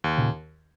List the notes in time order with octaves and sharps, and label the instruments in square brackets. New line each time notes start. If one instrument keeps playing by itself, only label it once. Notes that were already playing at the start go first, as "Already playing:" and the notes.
[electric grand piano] D#2
[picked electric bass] A#2 C#3